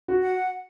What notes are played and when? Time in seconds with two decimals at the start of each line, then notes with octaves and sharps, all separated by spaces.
0.08 F#4
0.21 F#5